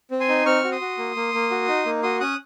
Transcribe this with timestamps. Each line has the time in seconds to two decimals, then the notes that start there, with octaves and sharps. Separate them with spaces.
0.11 C4
0.20 G#5 C6
0.29 D#4
0.45 C4 C#6 F6
0.64 F#4
0.72 C6 D#6
0.81 F#4
0.98 A#3
1.16 A#3
1.34 A#3
1.51 F#4
1.68 D#4
1.86 A#3
2.03 F#4 C6 D#6
2.20 C#4 D#6 F#6